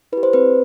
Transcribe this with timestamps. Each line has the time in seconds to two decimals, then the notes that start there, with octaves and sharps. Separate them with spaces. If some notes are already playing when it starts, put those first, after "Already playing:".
0.12 E4 G4 B4
0.23 C5
0.33 C4 B4